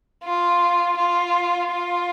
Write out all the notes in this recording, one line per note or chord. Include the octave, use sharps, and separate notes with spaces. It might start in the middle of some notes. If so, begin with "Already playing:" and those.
F4
F4
F4